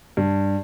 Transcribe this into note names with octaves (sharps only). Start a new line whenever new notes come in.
G2